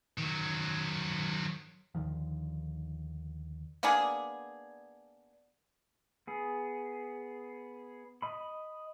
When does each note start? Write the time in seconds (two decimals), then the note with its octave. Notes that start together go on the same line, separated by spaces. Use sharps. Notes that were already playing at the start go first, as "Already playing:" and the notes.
0.18 D#3 F#3
1.95 D#2 D3 D#3 F3
3.83 A#3 B3 D4 G#4
6.27 B3 G#4
8.22 D#5 B5